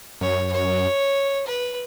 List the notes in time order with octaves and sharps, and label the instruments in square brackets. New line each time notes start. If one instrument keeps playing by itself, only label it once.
[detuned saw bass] F#2 [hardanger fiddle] C#5
[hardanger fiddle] C#5
B4